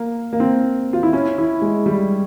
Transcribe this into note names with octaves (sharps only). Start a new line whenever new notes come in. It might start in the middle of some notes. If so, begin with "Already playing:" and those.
Already playing: A#3
A#3
C4
F4
E4
C#4
E4
G#3
G3